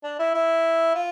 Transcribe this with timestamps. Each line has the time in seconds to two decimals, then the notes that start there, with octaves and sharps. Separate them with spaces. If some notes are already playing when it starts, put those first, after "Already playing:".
0.04 D4
0.19 E4
0.34 E4
0.95 F4